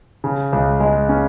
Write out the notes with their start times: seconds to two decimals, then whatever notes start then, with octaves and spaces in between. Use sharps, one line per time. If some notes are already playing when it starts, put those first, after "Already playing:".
0.24 C#3
0.52 C#2
0.80 G#3
1.09 C#4